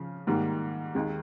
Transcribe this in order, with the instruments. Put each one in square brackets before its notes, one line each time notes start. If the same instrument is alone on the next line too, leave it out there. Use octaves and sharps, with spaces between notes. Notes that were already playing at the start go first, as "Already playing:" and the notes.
Already playing: [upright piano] C#3 F3
G#2 D#3 G3 A#3
D#2 D#3 G#3